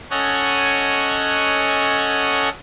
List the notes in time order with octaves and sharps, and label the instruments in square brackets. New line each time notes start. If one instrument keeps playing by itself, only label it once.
[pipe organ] C#4 A4 C#5 D#5 F#5 G#5